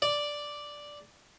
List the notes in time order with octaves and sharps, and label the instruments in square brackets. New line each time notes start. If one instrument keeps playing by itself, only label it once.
[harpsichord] D5